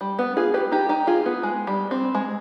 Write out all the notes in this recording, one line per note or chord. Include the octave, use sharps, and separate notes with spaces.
G3
B3
F4 G#4
G4 B4
D#4 G4
D#4 G4
F4 G#4
B3
G#3
G3
C4
G#3